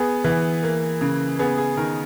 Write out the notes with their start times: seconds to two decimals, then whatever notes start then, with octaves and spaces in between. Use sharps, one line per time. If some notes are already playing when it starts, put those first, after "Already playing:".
Already playing: B3 G#4
0.24 E3
0.63 A#3
1.01 C#3
1.39 B3 G#4
1.58 G#4
1.77 D#3 A#4